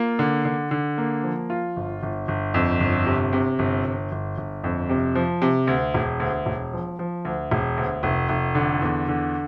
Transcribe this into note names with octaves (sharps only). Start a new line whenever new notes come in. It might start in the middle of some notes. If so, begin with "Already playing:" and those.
Already playing: A#3 F4
D3
D3
D3
A#3
F3
F4
G1
G1
G1
F2
G1
C3
C3
G1
G1
G1
G1
F2
C3
F3
C3
D2
E1
D2
E1
F3
F3
D2
E1
D2
F1
F1
D3
E2
D3